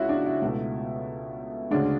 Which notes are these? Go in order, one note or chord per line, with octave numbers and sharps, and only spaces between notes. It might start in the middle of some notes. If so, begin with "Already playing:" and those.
Already playing: C#2 C#3 G#3 E4 F#4
D4
E4
C#2 B2 A3
D2 C#3 G#3 D4